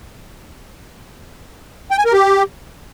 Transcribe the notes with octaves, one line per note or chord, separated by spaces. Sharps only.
G5
G#5
A#4
G4